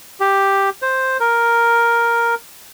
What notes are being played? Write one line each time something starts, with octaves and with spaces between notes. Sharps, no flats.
G4
C5
A#4